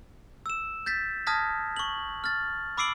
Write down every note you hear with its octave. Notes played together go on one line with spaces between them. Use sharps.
E6 E7
G6 A6 B6
A5 D#6 F6 G#6 A#6 B6
C#6 F#7
F6 A6
B5 D6 E6 C7 D7 F#7